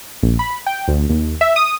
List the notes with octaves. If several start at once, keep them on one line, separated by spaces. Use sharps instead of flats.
A#1
B5
G5
D2
D#2
E5
D#6